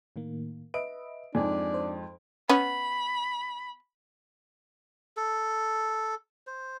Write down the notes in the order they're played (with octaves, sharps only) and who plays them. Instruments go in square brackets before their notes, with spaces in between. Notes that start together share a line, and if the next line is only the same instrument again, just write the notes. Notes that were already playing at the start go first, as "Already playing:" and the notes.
[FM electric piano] A2 D#3 A#3
[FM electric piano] B4 D#5 E5 [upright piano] D7
[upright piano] F2 G#2 [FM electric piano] C4 G#5 [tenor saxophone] D4
[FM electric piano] C5
[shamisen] B3 [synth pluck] C#4 [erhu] B5
[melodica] A4
C5